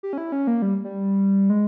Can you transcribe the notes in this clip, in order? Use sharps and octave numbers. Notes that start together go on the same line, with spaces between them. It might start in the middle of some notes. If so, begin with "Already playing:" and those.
G4
C#4
E4
C#4
A#3
G3
G3
G#3